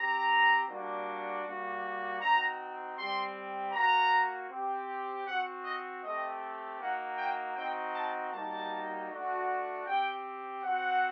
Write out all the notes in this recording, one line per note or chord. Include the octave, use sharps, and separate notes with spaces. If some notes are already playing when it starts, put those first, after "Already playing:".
Already playing: C4 G4 A#5
G3 A#3 D4 F#4
G3 A#3 F#4
C4 D#4 F#4 A#5
G3 C4 G4 C6
A#3 F#4 A#5
C4 G4
C4 F#4 F#5
D#5
A3 C4 G4 D#5
A#3 D#4 F#4 F#5
G5
C4 D#4 F#4 G5
A5
G3 A#3 D#4 F#4 A5
A3 D4 F#4
C4 G4 G5
C4 F#4 F#5